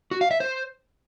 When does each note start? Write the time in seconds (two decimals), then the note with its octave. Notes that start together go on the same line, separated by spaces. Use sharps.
0.11 F#4
0.21 F5
0.31 E5
0.40 C5